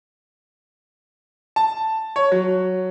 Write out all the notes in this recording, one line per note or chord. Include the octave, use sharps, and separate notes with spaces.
A5
C#5
F#3